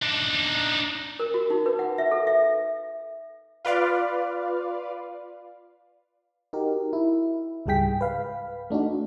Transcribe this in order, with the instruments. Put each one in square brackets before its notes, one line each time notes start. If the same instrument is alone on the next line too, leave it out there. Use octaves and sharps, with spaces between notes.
[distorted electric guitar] D4 D#4
[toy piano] A#4
F#4
D#4
B4
F#5
E5
A4
E5
[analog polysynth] F4 B4 D5 F5
[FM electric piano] D#4 F#4 G4 A#4
E4
C#2 G#2 G3 G#4 G5 B6
B4 F5
A3 D4 D#4 F#4